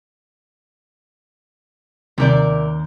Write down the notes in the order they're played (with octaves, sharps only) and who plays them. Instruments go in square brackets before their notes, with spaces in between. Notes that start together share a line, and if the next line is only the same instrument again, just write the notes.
[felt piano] D#2 D6 G6 [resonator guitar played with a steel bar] C3 A#4 D5